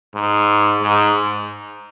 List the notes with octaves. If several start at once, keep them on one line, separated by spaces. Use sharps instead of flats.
G#2
G#2